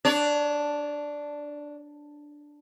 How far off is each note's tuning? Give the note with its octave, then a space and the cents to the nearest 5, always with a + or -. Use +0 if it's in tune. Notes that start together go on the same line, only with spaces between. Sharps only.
D4 +0 C#5 +35